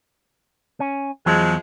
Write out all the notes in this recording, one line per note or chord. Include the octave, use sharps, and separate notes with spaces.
C#4
E2 F3 F#3 G#3